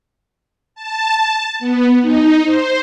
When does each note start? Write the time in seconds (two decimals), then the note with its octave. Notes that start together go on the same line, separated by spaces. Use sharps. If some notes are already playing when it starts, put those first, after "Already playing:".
0.75 A5
1.59 B3
2.01 D#4
2.44 C5